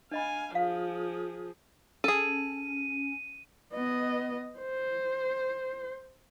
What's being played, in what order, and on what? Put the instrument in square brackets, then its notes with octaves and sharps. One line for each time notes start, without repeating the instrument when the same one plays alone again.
[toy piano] D4 D#5 B5 [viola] F5 G#5
[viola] F3 G#4 [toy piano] F5
[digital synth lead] C#4 [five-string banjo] G#4 A4 [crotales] D#7
[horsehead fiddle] B3 D#5
C5